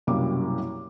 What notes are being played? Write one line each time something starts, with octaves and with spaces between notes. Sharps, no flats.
C2 F#2 B2 G3 A#3 D6